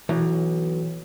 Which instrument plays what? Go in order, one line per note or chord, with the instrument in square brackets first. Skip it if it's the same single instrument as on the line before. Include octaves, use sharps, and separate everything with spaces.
[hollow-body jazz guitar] B1 [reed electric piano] E3